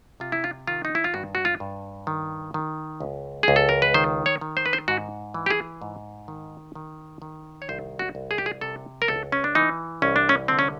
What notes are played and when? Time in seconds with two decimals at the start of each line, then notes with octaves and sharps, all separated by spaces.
0.20 C3 F4
0.32 E4
0.44 F4
0.67 D#3 F4
0.85 D#4
0.95 E4
1.04 F4
1.14 G2 F#4
1.35 F#4
1.45 F4
1.60 G2
2.07 D#3
2.54 D#3
3.00 C#2
3.43 C#2 G#4
3.56 A4
3.69 A#4
3.82 B4
3.94 D#3 C5
4.26 C#5
4.41 D#3
4.57 C5
4.66 B4
4.73 C5
4.88 G#2 F#4
5.34 E3
5.46 G4
5.50 G#4
5.82 G#2
6.28 D#3
6.75 D#3
7.22 D#3
7.62 C#5
7.69 C2 C5
7.99 F#4
8.15 C2
8.31 G#4
8.38 G4
8.46 G#4
8.61 C3 A4
9.02 A#4
9.08 C#2 A4
9.32 C#4
9.44 D4
9.55 E3 D#4
10.02 C2 C#4
10.16 D4
10.29 C#4
10.48 D3 C4
10.59 C#4